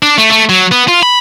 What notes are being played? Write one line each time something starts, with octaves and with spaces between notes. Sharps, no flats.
D4
A3
A3
F#3
B3
F4
B5